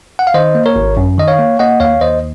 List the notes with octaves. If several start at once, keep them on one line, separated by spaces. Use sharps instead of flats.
F#5
F5
D#3 C5 D#5
A#3
A#4 C#5
G#1
F#2
D#3 D#5
C#5 F5
A#3
A#3 D#5 F#5
D#2 C#5 F5
D#2 C5 D#5